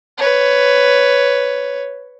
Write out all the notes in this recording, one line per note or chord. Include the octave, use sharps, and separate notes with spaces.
B4 C#5